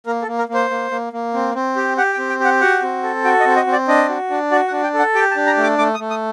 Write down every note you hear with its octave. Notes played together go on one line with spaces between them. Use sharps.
A#3 A#4
A4
A#3
A#4
A#3
C5
A#3
A#3
A#3
C4
C4
G4
G4 F#5
G5
C4
G5
G4 F#5
F#4 F#5
C4
A4
F#4 G5
D#5
C4
D#5
C4
D5
D4 D#5
F#4
D4
F#4 D5
F#5
D4
G5
A4
F#5
G4 G5
A5
D4
A#5
A3
D6
A3 D6
D#6
A3
D#6